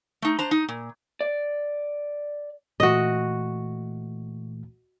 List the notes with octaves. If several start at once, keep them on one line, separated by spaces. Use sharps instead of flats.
A3 D#4
D4 C5 A#5
D#4
A#2
D5
A#2 E3 A3 F#4 D#5